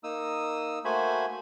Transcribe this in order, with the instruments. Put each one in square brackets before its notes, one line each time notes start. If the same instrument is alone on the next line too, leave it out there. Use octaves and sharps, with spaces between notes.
[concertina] A#3 D#4 D#6 E6
A3 A#3 F#4 C5 G#5 B5